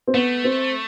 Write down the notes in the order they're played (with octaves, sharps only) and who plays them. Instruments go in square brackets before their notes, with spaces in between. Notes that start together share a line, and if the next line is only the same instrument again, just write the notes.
[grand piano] C4
[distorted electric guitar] A3 [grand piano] B3
[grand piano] C4